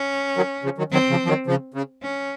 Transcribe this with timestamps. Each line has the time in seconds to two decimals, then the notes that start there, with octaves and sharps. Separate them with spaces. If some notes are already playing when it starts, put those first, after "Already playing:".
Already playing: C#4
0.37 D#3 F#3
0.64 C#3 F3
0.78 D#3 F#3
0.92 D#3 F#3 C4
1.10 C#3 F3
1.25 F3
1.28 D#3 F#3
1.47 C#3 F3
1.74 C#3
2.02 C#4